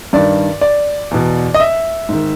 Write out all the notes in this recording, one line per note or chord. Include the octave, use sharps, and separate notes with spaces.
G2 D#3 D5
D5
E2 B2
D#5
E5
G#2 D#3